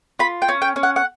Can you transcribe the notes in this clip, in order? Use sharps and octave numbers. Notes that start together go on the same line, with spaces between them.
F4 B5
G5
C#4
G5
C#4
F#5
F#5